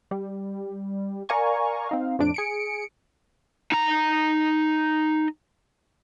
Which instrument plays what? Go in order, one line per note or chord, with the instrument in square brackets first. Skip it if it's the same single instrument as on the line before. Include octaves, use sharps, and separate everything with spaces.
[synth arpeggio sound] G3
A#4 D5 F5 G#5 A#5 C#6
C4 D#4 F5
F2 A2 D4 D7
G#4 C#7 D7
[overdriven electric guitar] D#4 A#5